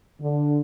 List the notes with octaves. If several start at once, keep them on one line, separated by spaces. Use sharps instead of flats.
D3